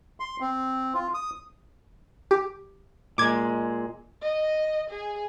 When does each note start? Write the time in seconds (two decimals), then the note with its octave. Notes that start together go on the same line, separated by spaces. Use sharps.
0.20 C6
0.40 C4
0.94 F4
1.14 D#6
2.31 G4
3.18 A#2 G#3 D6 G#6
4.22 D#5
4.90 G#4